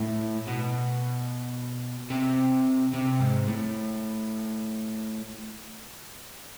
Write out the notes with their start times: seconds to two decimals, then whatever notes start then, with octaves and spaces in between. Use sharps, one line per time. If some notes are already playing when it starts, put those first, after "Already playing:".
Already playing: A2
0.47 B2
2.10 C3
2.93 C3
3.20 G#2
3.48 A2